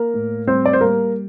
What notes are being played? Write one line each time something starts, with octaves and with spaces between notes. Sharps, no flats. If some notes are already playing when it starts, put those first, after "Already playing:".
Already playing: A#3 A#4
A2
G3 C4 C5
D5
C5
G3 A#3 A#4